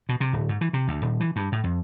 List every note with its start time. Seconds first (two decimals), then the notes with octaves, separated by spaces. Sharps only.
0.09 B2
0.20 C3
0.33 D1
0.49 G#2
0.61 E3
0.73 C3
0.88 D2
1.02 D#1
1.20 E3
1.36 G2
1.52 A2
1.64 F2